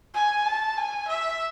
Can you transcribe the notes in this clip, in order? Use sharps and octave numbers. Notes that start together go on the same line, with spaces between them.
G#5
A5
G#5
E5